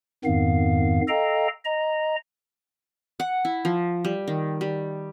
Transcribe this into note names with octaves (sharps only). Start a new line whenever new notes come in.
F2 G#2 D#3 B3 F5
A4 D#5 F5 G5 A#5
D#5 A#5
F#5
E4
F3
G3
D#3
G3